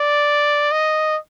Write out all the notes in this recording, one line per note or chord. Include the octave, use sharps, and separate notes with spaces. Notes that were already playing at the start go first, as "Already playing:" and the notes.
Already playing: D5
D#5